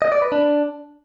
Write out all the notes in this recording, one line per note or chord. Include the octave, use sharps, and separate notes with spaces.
D#5
D5
B4
D4